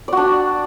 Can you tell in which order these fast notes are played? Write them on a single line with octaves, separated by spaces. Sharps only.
D5 F#4 D4